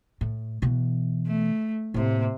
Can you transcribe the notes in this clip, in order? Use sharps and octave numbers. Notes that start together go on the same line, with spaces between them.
A2
B2 E3
A3
A2 C3 A#3